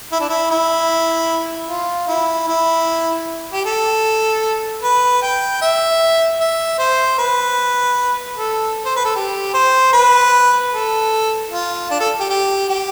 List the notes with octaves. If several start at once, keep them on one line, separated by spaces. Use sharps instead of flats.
E4
D4
E4
E4
F4
E4
E4
G4
A4
B4
G5
E5
E5
C5
B4
A4
C5
B4
A4
G4
C5
B4
A4
F4
D4
A4
G4
G4
G4